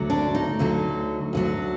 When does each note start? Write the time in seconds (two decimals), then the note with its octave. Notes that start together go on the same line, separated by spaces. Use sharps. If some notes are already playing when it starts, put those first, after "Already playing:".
Already playing: D2 D3 F#3
0.10 D4
0.35 D#4
0.59 D2 D3 F#3
1.33 D2 D3 F#3